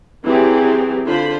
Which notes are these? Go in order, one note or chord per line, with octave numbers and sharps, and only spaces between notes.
E3 F#3 C4 G4 G#4
D3 F4 C5 B5